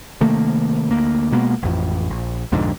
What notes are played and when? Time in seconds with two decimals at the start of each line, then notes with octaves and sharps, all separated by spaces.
0.21 C3 D#3 A3 A#3
0.91 D2 A#3
1.32 B2 G#3 A#3 B3
1.63 A1 F2
2.10 A#1
2.52 B1 F2 G#2 D3